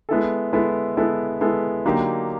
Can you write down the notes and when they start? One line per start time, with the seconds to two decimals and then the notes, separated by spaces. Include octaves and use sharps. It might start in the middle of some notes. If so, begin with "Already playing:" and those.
0.09 G#3 B3 E4 A4
0.53 G#3 B3 E4 A4
0.97 G#3 B3 E4 A4
1.41 G#3 B3 E4 A4
1.85 D3 F#3 A#3 D#4 G4